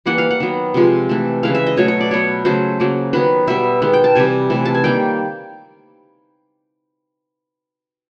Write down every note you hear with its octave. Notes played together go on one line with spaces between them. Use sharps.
E3 G3 A#3 F#5
F5
F#5
D#3 F#3 B3
C3 F3 G#3
E3 A3
C#3 E3 G#3 F5
E5
D#5
B2 F#3 A3 C#5
C#5
D5
B2 F#3 B3 C#5
C#3 F#3 A3 C5
C#3 F#3 A#3
D#3 F#3 B3 B4
B2 G3 B3 E5
D#3 G#3 B3
G5
A5
C3 E3 G3 G#5
C3 E3 A3
A5
G#5
D#3 G3 A#3 G5